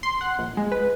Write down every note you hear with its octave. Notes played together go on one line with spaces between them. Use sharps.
C6
F#5
A#1
G#3
B4